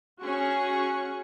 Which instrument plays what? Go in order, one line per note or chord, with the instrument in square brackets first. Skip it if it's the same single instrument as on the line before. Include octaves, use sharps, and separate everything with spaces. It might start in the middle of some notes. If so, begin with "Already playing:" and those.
[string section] C#4 F#4 G#4 C#6